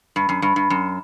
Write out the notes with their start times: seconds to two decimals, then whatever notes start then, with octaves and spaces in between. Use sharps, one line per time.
0.16 G2
0.29 F#2
0.42 G2
0.56 G2
0.70 F#2